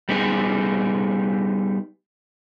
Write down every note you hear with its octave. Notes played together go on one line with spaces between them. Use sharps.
G3 B3 D#4 G#4